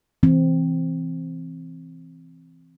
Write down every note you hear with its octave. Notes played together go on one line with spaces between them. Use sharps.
E3 C4